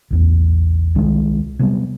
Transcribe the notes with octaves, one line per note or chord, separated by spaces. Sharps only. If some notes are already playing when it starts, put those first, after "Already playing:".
A#1 E2
C2 D#3 E3 G#3
C3 F#3 G3 B3